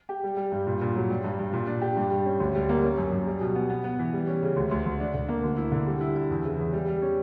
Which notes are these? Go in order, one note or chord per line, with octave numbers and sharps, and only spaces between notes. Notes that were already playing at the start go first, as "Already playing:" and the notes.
G4
G3
G3
G2
A#2
A#2
F#3
G3
G2
G2
A#2
D4
G4
G2
G3
C#4
D2
G3
A#3
C#4
F#2
F#2
G3
B2
B3
B3
B3
E3
G3
C#4
C#3
D2
D2
D2
D4
D3
A#3
D2
E4
D3
G3
E4
E4
E2
C#3
E2
G3
G3
C#4